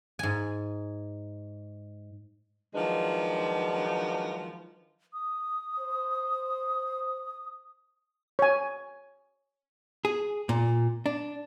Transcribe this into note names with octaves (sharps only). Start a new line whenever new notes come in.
G#2 G#5
D#3 F3 F#3 G#3 D4 B4
D#6
C5
C#5 G#5
G#4
A#2
D4